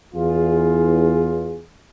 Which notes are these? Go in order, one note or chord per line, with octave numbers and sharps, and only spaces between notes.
E2 F4 G#4